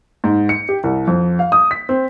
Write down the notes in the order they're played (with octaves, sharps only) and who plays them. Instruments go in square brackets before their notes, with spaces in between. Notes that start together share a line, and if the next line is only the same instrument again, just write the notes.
[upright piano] G#2
C#7
G4
C2
F2
F5
D#6
B6
C4